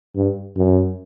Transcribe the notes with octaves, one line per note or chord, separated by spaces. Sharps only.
G2
F#2